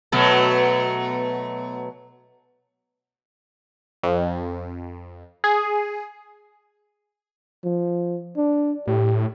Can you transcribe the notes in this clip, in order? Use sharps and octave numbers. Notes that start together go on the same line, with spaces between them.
B2 F#3 A3
F2
G#4
F3
D4
A2 G4